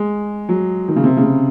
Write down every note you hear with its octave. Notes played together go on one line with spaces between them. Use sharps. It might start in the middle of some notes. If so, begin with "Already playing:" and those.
Already playing: G#3
F#3
D#3
C#3
C3
C#3
C3